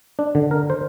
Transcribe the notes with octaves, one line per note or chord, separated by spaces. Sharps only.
D4
D3
A#4
C5